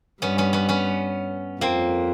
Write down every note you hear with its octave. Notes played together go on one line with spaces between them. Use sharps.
G2 B3 C#4
B3 C#4
B3 C#4
B3 C#4
F2 A#3 C4